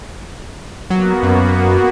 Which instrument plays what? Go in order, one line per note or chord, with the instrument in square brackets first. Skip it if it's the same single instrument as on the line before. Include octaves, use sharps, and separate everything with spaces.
[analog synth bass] F#3 [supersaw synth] A#3 B3 F#4
[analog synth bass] F#2